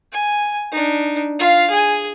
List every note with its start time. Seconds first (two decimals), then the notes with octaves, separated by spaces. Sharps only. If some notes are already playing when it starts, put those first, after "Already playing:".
0.13 G#5
0.72 D4 D#4
1.39 F4 F5
1.70 G#4 G#5